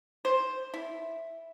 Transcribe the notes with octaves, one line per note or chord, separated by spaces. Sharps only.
C5
E4